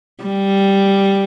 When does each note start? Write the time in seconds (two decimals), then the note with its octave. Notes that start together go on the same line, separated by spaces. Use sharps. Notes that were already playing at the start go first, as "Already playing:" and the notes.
0.24 G3